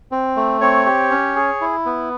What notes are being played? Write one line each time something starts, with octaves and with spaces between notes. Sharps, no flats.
C4
A3
C4 C#5
G4
C#4
G#4
E4
B3